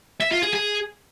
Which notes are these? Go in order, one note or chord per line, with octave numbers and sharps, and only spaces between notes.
E5
F4
G#4
G#4